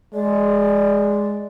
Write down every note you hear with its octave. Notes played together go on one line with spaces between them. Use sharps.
G#3 D5